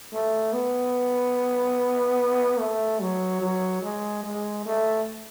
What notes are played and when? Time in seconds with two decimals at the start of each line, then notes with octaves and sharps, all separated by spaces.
0.13 A3
0.53 B3
2.59 A3
3.01 F#3
3.41 F#3
3.83 G#3
4.23 G#3
4.66 A3